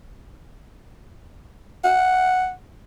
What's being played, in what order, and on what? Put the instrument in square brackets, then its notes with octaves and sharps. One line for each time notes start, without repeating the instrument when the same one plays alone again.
[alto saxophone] F#5